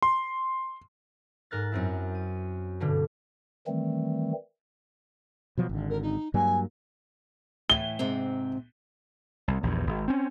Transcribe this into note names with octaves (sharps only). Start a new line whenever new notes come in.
C6
G#2 A#4 F#6 A6
F#2 C4 E4
D#7
G2 B2 D3
D#3 E3 G3 A3 C4
B2 F3 F#3
G#1 D3
A#4
D#4
G2 F#3 A#3 G#5
A2 E3 G7
G#2 C3 C4
C2
A#1 E2 G2
G#1
C4 C#4